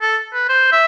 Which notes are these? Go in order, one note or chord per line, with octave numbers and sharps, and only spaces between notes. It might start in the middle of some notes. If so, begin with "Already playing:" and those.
A4
B4
C5
E5